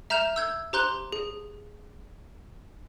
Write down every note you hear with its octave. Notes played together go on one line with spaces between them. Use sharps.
E5 A#5 F6 G6 E7 F7
E6 G6 G#6
G4 C5 A#5 C6 F#6 G6
G#4